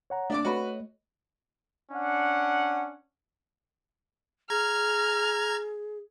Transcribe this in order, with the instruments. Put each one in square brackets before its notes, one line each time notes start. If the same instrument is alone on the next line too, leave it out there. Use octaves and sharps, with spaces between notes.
[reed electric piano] C#5 F#5 A#5
[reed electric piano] A3 [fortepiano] D4 D5 D6
[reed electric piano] A3 C#5 D#5 [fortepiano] F#4 B4
[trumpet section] C#4 D4 F#5
[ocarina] G#4 [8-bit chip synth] A#5 G#6 [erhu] F6